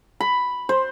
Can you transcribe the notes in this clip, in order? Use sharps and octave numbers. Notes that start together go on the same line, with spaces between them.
B5
C5